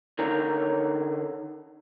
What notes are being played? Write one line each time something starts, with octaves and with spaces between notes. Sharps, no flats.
D3 D#4 A#4 C#5 A#5